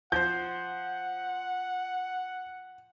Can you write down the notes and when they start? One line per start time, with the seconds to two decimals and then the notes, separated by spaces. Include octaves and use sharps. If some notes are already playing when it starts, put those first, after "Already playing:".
0.12 F3 C5 F#5 G6